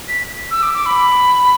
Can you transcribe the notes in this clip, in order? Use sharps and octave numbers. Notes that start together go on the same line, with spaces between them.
B6
E6
D6
D6
B5